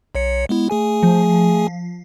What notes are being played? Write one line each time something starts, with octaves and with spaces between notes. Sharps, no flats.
B1 C#5 C#7
G#3 B3 E4
A3 G#4 G#5
F3